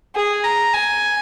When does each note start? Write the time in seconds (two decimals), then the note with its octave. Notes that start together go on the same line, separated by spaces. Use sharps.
0.16 G#4
0.44 A#5
0.73 G#5